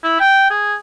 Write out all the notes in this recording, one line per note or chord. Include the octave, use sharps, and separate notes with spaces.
E4
G5
G#4